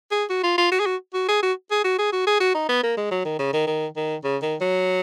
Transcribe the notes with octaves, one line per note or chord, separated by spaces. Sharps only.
G#4
F#4
F4
F4
F#4
G#4
F#4
F#4
G#4
F#4
G#4
F#4
G#4
F#4
G#4
F#4
D#4
B3
A#3
G#3
F#3
D#3
C#3
D#3
D#3
D#3
C#3
D#3
F#3